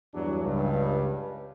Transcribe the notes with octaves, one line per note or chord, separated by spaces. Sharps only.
E2 G2 F#3 D4
C#2 G2